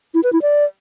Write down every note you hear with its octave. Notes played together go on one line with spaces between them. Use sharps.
E4
B4
E4
D5